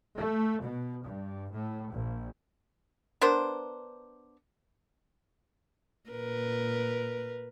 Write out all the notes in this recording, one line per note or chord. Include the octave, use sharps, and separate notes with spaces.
A3
B2
G2
A2
A#1
B3 D4 A#4 C5
A#2 A#4 B4